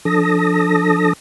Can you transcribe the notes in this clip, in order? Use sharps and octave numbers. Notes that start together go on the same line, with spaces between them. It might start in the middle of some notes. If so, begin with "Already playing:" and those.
F3 D4 A4 A5 D#6 A#6